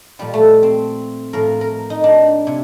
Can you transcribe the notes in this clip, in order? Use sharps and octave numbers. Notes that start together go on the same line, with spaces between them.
A#2 F3 G3
A3
C4
A2 F3 A#4
A#4
D#4
D4
C3